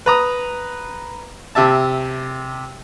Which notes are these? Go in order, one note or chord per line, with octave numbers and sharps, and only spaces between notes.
B4 A#5 D#6
C3 G4 E5 A5